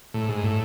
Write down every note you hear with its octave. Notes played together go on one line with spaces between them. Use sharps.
A2
G#2
A2